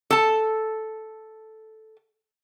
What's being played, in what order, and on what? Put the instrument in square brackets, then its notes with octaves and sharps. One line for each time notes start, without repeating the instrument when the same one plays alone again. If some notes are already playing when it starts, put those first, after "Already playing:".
[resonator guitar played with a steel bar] A4 A5